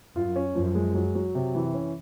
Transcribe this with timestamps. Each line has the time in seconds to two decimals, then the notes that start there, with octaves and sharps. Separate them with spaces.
0.16 F#2 F4
0.36 C#4
0.55 F#2 F3
0.75 G#3
0.95 F#3
1.15 F#3
1.35 C3
1.55 E3
1.74 C#4